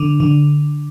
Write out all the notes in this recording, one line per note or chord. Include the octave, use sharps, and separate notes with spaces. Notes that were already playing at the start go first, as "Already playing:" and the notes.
Already playing: D3
D3